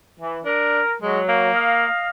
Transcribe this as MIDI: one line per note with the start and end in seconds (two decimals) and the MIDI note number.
0.20 0.40 52
0.45 0.81 62
0.45 0.94 70
1.02 1.48 54
1.02 1.20 56
1.29 1.87 58
1.54 2.09 75
1.54 2.09 77